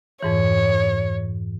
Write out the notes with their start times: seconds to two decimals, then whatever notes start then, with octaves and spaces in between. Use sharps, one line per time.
0.23 F2 G#2 E3 C#5